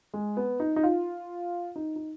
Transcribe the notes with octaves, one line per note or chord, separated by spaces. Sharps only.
G#3
B3
D#4
D#4
F4
D#4
D#4